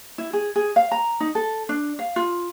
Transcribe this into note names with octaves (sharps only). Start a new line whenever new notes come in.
E4
G#4
G#4
F5
A#5
D#4
A4
D4
F5
F4